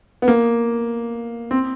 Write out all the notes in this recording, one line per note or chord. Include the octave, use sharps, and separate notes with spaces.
B3
A#3
C4